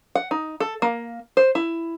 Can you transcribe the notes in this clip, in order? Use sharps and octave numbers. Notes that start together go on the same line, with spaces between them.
F#5
D#4
A4
A#3
C5
E4